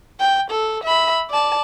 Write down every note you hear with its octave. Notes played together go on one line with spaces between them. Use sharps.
G5
A4
E5 B5
D5 A5